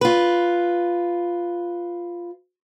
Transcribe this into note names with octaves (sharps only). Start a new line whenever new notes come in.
F4 B4